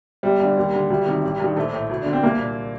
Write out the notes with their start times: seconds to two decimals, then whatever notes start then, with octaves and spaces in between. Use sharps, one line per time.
0.23 G1 G3
0.40 G2 D3
0.57 D#2
0.73 D3
0.90 D2 G3
1.06 C3 D#3
1.23 A1
1.39 G2 D#3
1.56 A#1 A3
1.73 A2
1.89 D2
2.02 D3 D4
2.13 C4
2.23 C2 A#3
2.39 A#2